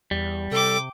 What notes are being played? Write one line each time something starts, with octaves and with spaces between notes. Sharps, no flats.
E2 G3
C3 A4 G5 D6